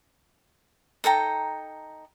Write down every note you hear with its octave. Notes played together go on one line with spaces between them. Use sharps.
D#4 A4 G5 A#5